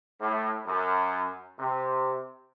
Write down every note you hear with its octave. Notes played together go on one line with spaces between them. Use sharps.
A2
F#2
C3